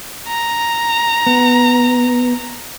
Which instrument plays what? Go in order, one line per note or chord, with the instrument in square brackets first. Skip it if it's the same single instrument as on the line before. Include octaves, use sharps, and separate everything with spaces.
[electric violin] A#5
[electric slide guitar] B3